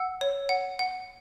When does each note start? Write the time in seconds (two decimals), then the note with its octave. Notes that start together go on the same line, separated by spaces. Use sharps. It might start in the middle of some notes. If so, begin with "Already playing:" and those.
Already playing: F#5 E6
0.21 C#5
0.49 F#5
0.79 F#5